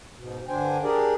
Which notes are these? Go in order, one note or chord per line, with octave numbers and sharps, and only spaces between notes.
G#2 B2
G2 D3 D4 C5 G5 G#5
D4 G4 G#4 A#4 D5